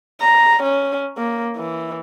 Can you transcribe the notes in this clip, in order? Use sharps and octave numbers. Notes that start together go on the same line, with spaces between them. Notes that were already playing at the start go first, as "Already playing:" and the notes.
A#5
C#4
A#3
E3